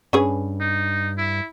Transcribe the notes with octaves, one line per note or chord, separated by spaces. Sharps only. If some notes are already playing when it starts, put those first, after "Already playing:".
G2 C#4 G#4 B4
D#4
E4